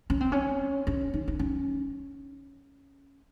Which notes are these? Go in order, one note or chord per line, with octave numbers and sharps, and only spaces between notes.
C#4
C4
C#4
C#4
D#4
D#4
C#4